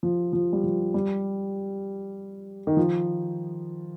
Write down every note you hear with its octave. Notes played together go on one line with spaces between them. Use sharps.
F3
F3
G3
F3
G3
D#3
F3